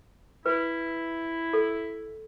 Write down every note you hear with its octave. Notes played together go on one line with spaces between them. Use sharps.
E4 B4
A4